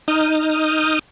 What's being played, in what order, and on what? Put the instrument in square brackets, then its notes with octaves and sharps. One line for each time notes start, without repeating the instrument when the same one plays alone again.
[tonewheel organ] D#4 D#6 F6